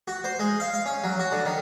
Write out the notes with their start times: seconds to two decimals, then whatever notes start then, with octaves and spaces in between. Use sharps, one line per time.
0.08 F#4
0.24 C5
0.39 G#3
0.60 F5
0.74 F5
0.86 C#4
1.04 F#3
1.19 F#4
1.32 D3
1.45 D#3